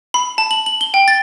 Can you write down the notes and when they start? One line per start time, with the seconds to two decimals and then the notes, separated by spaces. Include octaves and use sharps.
0.14 B5
0.38 A5
0.51 F#7
0.66 F#7
0.81 G7
0.94 G5
1.08 A6